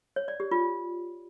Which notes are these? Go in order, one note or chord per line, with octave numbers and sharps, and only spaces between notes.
C#5
D5
G4
F4